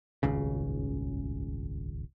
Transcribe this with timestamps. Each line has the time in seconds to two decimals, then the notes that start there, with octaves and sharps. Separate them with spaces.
0.23 D#1 G#1 C#2 C#3